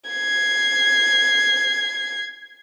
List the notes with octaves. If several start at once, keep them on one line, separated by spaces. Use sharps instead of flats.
G#6 C7